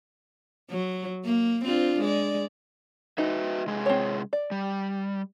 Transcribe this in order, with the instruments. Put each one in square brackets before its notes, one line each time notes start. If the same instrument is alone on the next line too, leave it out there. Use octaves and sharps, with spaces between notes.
[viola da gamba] F#3
A#3
C4 D4 F4
G#3 D5
[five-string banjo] D#4 [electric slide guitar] F#4 B4 E5
[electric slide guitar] C3 G#3 G#4
[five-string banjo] C4 C#5
D5
[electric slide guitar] G3